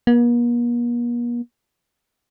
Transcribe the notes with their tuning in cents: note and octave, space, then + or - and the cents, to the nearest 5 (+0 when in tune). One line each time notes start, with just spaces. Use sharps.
A#3 +45